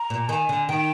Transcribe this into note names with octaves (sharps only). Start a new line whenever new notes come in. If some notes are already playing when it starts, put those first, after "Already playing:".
Already playing: A#5
A#2
D#3 G#5
D3
D#3 G5